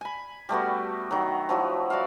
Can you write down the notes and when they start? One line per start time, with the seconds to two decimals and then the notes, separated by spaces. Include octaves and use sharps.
0.01 G#5 B5
0.49 G3 A3 B3 F#4
1.11 D#3 F#3
1.49 F3 F#3 E4 F#4
1.90 F#4 D5 E5 F5